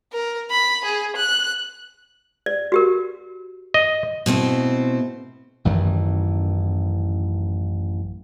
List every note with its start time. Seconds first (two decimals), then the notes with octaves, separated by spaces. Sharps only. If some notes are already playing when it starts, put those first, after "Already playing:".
0.13 A#4
0.51 B5
0.85 G#4
1.16 F#6
2.46 D5
2.72 F#4 G4 A#4
3.74 D#5
4.26 B2 A3 C4 E4
5.65 A1 F#2 D#3 E3